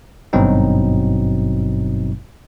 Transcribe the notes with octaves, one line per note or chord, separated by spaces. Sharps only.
G#1 G2 B2 F#3 C4 D#4